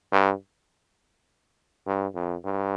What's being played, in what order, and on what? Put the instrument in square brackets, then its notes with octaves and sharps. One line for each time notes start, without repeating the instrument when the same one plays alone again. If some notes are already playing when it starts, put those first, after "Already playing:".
[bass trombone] G2
G2
F2
G2